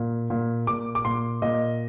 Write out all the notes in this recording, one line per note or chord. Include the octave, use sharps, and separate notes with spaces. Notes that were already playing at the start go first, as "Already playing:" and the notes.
Already playing: A#2
A#2
A#2 D6
D6
A#2 C6
A#2 D#5